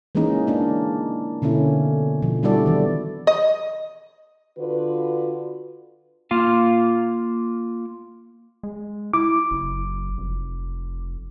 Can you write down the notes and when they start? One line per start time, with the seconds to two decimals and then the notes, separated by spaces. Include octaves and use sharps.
0.15 E3 G#3 A#3 C#4 D#4
0.47 A#3 D4
1.42 B2 D3 A#3 C#4 E4
2.22 B2 F3
2.43 G3 D4 E4 F#4 A4 D5
2.66 D#3 E3
3.27 D#5
4.58 D3 D4 F4 F#4 B4
6.31 A#3 F4 F5
8.63 G#3
9.14 E4 D6
9.51 F#1
10.18 F1